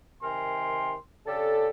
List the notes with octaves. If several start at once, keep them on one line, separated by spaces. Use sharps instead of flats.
C3 D#3 A#4 G5 G#5 C6
C#3 D4 G4 A4